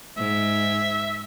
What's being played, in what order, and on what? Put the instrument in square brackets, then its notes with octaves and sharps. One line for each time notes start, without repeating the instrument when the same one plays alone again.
[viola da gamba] G#2 [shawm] E5